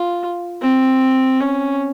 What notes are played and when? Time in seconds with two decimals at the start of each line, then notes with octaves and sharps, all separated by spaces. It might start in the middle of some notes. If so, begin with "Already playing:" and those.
Already playing: F4
0.62 C4
1.41 C#4